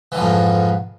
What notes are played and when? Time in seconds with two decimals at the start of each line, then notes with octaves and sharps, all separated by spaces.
0.12 E3
0.15 D3
0.18 F2
0.21 G#2